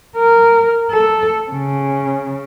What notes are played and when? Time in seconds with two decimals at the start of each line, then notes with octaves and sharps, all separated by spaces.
0.16 A#4
0.91 A4
1.51 C#3